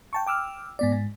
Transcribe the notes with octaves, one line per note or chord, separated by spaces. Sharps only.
G5 A5 C#6
G5 D6 E6 F6
G#2 B3 D5
G#2